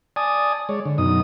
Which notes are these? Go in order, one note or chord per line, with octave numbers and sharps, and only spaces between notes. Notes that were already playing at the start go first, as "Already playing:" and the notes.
D5 G#5 A5 D#6
G#3 C#5 D5
D3
F#2 B2 D#4 D#6